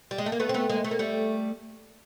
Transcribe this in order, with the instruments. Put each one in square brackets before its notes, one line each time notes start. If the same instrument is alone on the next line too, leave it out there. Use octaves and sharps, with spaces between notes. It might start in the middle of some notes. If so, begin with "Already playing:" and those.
[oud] G3
G#3
A3
A#3
A3 B3
C4
A3 B3
G#3 A#3
A3
A#3
G3 A3